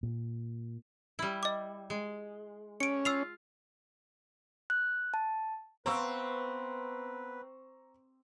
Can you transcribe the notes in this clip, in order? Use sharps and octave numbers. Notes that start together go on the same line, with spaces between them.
A#2
G3 E4
D#5 D6
G#3
C#4 C#7 D7
F4 E6 C7 F7
F#6
A5
B3 C4 B4 F5 A#5 C#6 E6